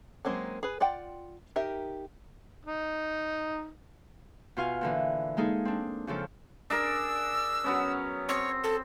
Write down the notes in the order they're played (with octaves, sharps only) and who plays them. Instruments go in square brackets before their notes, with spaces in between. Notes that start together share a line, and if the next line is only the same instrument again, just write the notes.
[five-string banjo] F#3 G#3 A#3 C4 C#4
G#4 B4
F4 D5 F#5 G5
D#4 G4 A#4 E5
[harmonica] D#4
[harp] B2 F4 F5 G#5
A#2 D3 E3
G#3 A#3 D#4 G#4 A4
C4 D4
F2 C#3 F3 A4
[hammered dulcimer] D4 G#4 A#4 [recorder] E6
[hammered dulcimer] F#3 B3 C#4
[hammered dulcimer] C4 [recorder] C#5
[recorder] A4